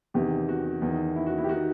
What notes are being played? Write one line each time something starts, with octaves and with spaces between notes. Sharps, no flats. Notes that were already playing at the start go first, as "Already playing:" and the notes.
E2 C3 D#3 G4
F#4
E2 D#3
E4
F#4
E4
G4
D#3 F#4